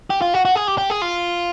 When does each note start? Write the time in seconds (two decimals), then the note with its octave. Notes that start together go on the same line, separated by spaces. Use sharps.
0.10 G4
0.22 F4
0.34 F#4
0.45 F#4
0.56 G#4
0.68 G4
0.78 G4
0.90 G#4
1.02 F4